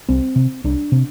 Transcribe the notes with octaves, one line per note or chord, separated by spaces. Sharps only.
C2 C4
C3
C2 D4
C3